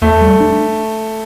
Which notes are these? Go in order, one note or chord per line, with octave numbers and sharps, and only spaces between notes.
E2 A3
G3
D4